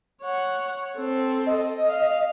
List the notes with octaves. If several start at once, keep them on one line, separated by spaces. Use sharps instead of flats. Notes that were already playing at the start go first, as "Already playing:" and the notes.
C#5 F#5
C4 A4
D#5
F5